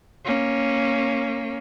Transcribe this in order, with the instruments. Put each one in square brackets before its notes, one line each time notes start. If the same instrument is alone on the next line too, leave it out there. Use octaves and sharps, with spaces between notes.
[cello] A#3 C#4